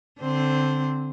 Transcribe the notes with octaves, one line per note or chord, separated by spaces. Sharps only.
D3 C4 C5